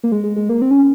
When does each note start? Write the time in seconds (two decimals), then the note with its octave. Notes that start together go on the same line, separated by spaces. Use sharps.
0.03 A#3
0.12 G#3
0.24 G#3
0.36 G#3
0.49 A#3
0.62 C4
0.71 C#4